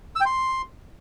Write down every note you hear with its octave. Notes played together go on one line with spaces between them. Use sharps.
E6
G5
C6